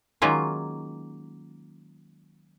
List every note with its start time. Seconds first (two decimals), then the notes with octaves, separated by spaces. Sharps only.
0.22 D#3 F#3 G#3 A#3 C#4 F4